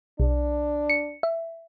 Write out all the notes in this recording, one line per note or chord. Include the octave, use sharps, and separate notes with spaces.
B1 D4
C#7
E5